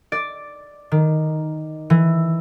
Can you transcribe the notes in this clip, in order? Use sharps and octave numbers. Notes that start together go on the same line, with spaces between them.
D5
D#3
E3